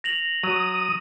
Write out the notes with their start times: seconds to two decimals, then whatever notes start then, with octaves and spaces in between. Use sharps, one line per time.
0.04 A#6 F7 F#7
0.43 F#3 D#6